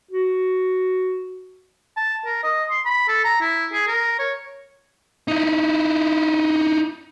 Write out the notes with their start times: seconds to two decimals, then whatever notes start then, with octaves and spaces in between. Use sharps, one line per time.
0.11 F#4
1.97 A5
2.26 A#4
2.43 D#5
2.70 C6
2.85 B5
3.08 A4
3.25 A#5
3.41 E4
3.73 G#4
3.88 A#4
4.19 C#5
5.28 D#4 E4